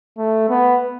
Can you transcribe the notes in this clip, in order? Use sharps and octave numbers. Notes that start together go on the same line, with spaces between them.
A3
B3